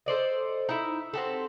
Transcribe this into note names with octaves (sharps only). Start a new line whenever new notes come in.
A4 C5 D5 D#5
D#4 E4 E5
C4 F#4 G4 A4